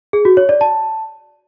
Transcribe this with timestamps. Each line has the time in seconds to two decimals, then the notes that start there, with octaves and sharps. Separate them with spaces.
0.13 G#4
0.25 F#4
0.37 C#5
0.49 D5
0.61 A5